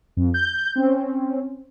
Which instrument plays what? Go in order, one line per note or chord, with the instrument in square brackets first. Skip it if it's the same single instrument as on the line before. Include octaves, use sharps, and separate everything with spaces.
[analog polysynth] F2
G6
C4 C#4